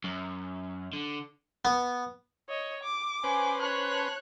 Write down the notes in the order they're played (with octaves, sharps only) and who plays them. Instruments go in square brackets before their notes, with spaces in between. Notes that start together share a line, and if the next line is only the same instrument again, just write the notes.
[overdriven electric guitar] F#2
D3
[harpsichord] B3
[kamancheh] C#5 D#5
D6
[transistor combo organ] C#4 B4 C5 [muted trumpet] G#5
[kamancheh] C#5 F#6 [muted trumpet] A5